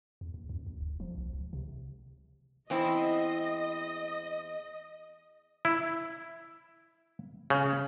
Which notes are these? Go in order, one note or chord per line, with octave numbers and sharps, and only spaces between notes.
E2
D#2
F#2
D2
F1
F3
B1
C#2
C3
E2 C4 E4 D#5
E4
C#3